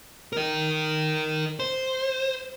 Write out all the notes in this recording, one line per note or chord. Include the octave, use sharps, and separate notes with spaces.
A#4 D#5
C5